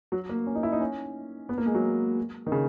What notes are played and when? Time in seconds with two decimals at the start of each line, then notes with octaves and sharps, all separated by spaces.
0.12 F#3
0.29 A#3
0.47 C#4
0.55 D#4
0.63 E4
0.72 D#4
0.81 C#4
1.49 B3
1.58 A#3
1.66 G#3
1.75 F#3
2.47 D#3
2.52 C#3